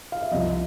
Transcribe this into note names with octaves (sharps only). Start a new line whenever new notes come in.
F5
E5
C2 C3 F3 D#5